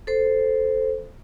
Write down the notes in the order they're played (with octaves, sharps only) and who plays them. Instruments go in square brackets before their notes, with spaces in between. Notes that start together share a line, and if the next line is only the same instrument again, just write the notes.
[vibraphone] A4 C5